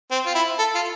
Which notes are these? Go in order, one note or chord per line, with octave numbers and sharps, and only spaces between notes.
C4
F4
E4
A4
F4